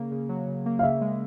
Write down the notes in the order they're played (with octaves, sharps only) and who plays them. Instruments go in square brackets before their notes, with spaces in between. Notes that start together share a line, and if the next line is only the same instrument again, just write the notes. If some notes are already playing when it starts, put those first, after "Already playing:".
Already playing: [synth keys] C#3 A#3
C#3
F#3
C#3
A#3
[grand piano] F5
[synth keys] C#3 [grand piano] E5
[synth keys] G#3